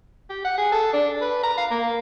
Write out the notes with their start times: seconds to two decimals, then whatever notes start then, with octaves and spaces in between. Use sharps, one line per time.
0.30 G4
0.44 F#5
0.58 G#4
0.72 A4
0.93 D4
1.21 B4
1.43 A#5
1.57 F5
1.71 A#3